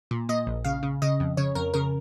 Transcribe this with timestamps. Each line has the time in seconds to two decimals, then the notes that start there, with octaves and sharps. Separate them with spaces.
0.11 A#2
0.29 A#2 D#5
0.47 A#1
0.65 C#3 F5
0.83 C#3
1.02 C#3 D#5
1.20 F2
1.37 C#3 C#5
1.55 F2 A#4
1.74 C#3 A#4